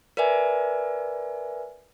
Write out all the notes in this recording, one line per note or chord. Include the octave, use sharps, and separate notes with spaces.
A#4 B4 D5 E5 G#5